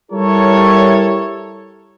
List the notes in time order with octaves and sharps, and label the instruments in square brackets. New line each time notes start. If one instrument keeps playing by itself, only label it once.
[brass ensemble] G3 E4 G4 A4 A#4 C#5